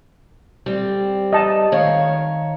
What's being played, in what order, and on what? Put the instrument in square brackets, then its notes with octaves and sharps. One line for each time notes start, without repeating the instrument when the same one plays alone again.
[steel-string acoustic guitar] G3 C4
[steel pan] D#5 A5
[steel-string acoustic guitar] D#3 C#5 F5